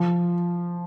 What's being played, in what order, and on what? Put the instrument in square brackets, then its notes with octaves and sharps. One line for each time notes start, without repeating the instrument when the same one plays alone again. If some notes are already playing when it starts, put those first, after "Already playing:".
Already playing: [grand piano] F3